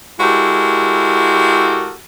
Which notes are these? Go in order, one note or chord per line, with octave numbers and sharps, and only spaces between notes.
G#3 E4 F#4 G4 A4 A#4